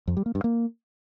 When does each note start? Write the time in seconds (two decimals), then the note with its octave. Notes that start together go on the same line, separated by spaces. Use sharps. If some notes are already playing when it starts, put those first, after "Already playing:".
0.08 F2
0.17 G3
0.26 A#3
0.35 G2
0.44 A#3